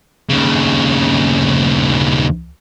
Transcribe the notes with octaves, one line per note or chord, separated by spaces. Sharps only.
D#2 C#3